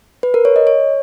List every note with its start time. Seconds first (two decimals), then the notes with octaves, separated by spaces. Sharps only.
0.23 B4
0.34 A#4
0.45 C#5
0.56 D#5
0.67 C#5